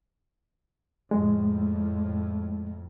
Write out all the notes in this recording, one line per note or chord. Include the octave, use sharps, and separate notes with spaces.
F2 A2 G#3